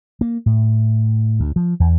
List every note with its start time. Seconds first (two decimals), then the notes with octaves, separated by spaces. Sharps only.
0.21 A#3
0.46 A2
1.40 D2
1.56 F3
1.80 E2